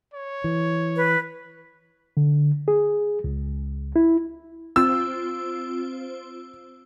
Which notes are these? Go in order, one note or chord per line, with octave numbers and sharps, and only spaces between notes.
C#5
E3
B4
D3
G#4
C#2
E4
C4 F4 C5 E6